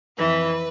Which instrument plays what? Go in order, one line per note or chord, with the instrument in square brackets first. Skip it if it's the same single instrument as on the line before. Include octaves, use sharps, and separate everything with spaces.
[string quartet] F2 E3 B4